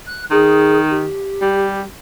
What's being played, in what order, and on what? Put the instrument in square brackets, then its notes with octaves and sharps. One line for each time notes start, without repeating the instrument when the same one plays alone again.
[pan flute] F#6
[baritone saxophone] D#3 [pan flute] G#4
[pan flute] G4
[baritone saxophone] G3